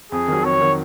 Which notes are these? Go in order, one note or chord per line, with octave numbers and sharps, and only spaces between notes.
F2 G#4
D#3 F#3
F2 C#5
D#3 F#3